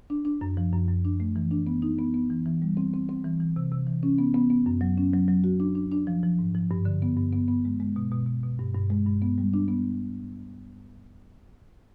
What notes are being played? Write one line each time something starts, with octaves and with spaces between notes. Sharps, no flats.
D4
D4
F#2
F3
F#2
F#2
D4
A3
E3
D4
B3
D#4
B3
B3
E3
E3
G3
C4
C4
C4
E3
E3
C3
C3
E3
C#4
B3
B3
B3
F#2
F#3
C#4
F#3
F#3
F#4
D4
D4
D4
F3
F3
G#2
F3
G2
D3
B3
G2
B3
B3
G#3
G#3
B2
B2
B2
B2
G2
G2
G#3
G2
B3
G3
D4
B3